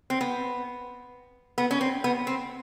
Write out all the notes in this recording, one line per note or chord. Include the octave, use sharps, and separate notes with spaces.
C4
B3
B3
C#4
C4
B3
C4